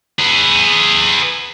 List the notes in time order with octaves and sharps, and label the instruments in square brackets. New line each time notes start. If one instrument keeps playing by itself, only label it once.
[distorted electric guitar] G#4 B4